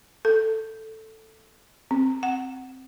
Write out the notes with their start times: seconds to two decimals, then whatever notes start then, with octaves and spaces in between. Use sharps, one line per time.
0.25 A4
1.91 C4
2.23 F#5